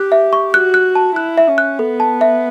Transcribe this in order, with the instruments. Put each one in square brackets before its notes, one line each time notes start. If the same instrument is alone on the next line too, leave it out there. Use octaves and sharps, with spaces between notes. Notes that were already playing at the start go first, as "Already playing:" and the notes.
Already playing: [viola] G4 [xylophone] F#6
[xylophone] E5
C#6
[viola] F#4 [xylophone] F#6
[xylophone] F#6
A5
[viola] E4 [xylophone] F#6
[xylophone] E5
[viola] C#4
[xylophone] F#6
[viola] B3 [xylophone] A4
[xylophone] A5
E5